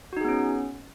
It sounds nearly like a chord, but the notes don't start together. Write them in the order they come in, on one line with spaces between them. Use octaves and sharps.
F#4 D#4 G#4 B3 C#4